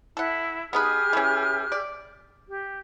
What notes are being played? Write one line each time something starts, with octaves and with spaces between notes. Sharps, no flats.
E4 A4 F#5
B3 D#4 G4 G#4 B4 F6
E3 C#4
D5
G4